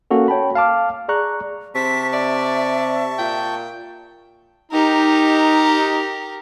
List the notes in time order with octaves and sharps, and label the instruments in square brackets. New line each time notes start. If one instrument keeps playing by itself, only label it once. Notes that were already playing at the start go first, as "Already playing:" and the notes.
[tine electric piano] A#3 C#4 F#4 A4
C#5 G5 A5 B5
F5 A5 D6 F6
G#4 D5 A#5 C#6 F#6
[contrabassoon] C3 [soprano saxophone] C4 [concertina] A5 C#6 [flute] B6
[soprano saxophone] D5 [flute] E5
[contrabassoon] A#2 [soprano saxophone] G5
[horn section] D#4 [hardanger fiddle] G4 A#4